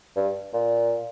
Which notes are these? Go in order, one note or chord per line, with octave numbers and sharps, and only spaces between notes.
G2
A#2